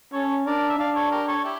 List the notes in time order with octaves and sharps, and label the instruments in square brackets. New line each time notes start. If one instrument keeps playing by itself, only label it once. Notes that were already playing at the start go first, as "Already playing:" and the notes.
[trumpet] C#4 [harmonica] A4 C#5
[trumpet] D4 [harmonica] A#4 D5
[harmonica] E5
[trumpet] D4 [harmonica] D5 F5
[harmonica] A4 C#5
G4 A#4
A4 C#5
E4 G4